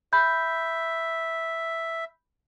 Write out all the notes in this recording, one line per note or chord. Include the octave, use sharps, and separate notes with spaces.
E5 B5 G6